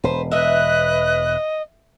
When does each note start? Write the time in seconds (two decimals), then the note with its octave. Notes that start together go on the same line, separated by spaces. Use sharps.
0.04 E1 B4 C5
0.31 B4 D#5 E5 F#6